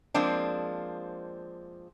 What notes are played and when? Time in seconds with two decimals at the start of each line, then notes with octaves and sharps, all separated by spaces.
0.14 F3 G#3 A#3 C4 D4